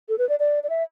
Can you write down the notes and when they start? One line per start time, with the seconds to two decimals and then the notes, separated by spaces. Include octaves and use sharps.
0.09 A4
0.18 B4
0.29 D5
0.39 D5
0.63 D5
0.69 E5